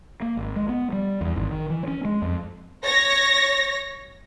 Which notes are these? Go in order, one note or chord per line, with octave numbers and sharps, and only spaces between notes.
A#3
G#1
G#3
B3
G3
E2
G#1
D#3
E3
C#4
G#3
F2
C#5 A#6